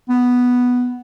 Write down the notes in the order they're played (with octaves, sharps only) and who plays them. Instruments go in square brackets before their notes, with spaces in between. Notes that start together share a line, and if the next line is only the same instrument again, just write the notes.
[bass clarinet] B3